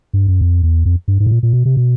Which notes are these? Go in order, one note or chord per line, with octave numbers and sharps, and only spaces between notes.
G2
F#2
F2
E2
F2
G2
G#2
A2
A#2
A#2
B2
C3
B2